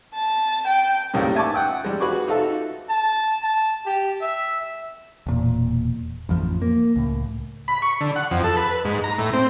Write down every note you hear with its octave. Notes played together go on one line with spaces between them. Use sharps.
A5
G5
C2 A2 C#3 G3 A#3
E5 G#5 A5 C#6 D6
F#5 G5 E6
G3 G#3
F#4 G#4 B4 C#6 D6
D#4 F4 F#4 A4 E5
A5
A5
G4
E5
E1 A#2
A1 F2 F3
A#3
C#2 A2
B5
C#6
D3
F#5
F2
A4
B4
G#2
A#5
A2
C4